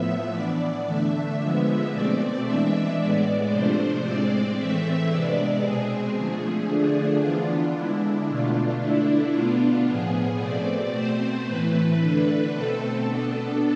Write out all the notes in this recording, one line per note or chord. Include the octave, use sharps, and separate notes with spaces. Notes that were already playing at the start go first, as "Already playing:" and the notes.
Already playing: A2 F3 B3 E5
E3 B3 D4 D5
D3 A3 D4 E5
D3 F3 G#3 B3
B2 A3 C4 D5
E3 G#3 D4 E5
A2 G#3 B3 D5
C3 F3 A3 D4 C5
A2 G#3 C4 D5
A2 E3 A3 C4 E5
C3 G#3 B3 D4 D5
B2 G#3 C4 G#4
D3 F3 A3
D3 F3 A3 D4
E3 B3 D4 F4
D3 G#3 D4 E4
B2 A3 D4 F4
D3 A3 D4 E4
B2 B3 D4 F4
A2 F3 B3 G#4
B2 A3 C4 D5
B2 A3 C4 C5
A2 E3 A3 B4
D3 A3 D4
B2 A3 C4 A4
B2 B3 D4 A4